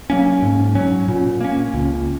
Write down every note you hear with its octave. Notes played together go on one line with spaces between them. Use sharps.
F#3 A#3 C#4
G#2
F#3 C#4
A#2
A#3 C#4
C#2